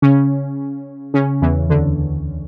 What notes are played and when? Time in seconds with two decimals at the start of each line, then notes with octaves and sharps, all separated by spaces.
0.02 C#3 C#4
1.14 C#3 C#4
1.42 E2 E3
1.69 D2 D3